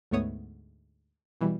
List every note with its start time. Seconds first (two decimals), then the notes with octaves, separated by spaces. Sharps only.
0.11 D2 G#2 A3 B3 C#5 D#6
1.41 B2 E3 G3